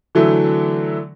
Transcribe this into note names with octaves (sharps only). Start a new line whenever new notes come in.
D3 E3 F#3 A3 E4